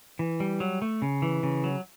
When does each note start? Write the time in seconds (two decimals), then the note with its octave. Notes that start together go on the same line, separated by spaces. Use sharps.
0.19 E3
0.40 G3
0.60 F#3
0.82 A3
1.02 C#3
1.22 E3
1.43 C#3
1.64 F#3